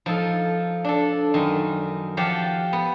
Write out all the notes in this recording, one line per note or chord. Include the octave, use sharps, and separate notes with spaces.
F3 D#4 A4
D4 A4
F#2 D#3
F3 G4 F5 F#5 A5
B3